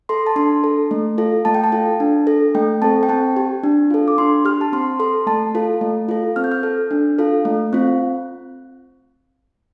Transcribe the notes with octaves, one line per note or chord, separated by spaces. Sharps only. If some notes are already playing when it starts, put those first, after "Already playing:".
A4 C6
A5
D4 C6
A4
A3
F4 A4
A3 A5
G5
A5
F4 A4
D4
A4
A3 G5
C4 A4 A5
G5
C4 A5
G4
D4
F4 A4
D6
D4 C6
G4 F6
A5
C4 C6
A4 C6
A3 A5
F4 A4
A3
F4 A4
C4 F6
G6
F6
A4
D4
F4 A4
A3
C4 F4